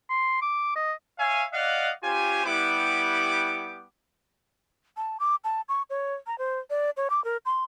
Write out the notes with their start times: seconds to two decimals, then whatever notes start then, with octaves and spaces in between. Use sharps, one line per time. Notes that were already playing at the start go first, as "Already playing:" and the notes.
0.09 C6
0.42 D6
0.76 D#5
1.18 C#5 E5 F5 G#5
1.53 D5 D#5 F5 F#5
2.03 C#4 F4 G4 C5 G#5
2.45 G3 B3 E4 G4 F#5 D6
4.97 A5
5.20 D6
5.44 A5
5.69 C#6
5.90 C#5
6.27 A#5
6.38 C5
6.70 D5
6.97 C#5
7.10 D6
7.24 A#4
7.46 C6